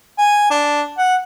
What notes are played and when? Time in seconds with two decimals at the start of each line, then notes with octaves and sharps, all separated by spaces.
0.18 G#5
0.51 D4
0.98 F#5